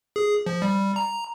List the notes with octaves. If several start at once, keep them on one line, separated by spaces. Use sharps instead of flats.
G#4
F3
G3
A#5